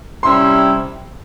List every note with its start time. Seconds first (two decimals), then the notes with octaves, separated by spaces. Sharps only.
0.23 C3 G3 C#4 E4 C6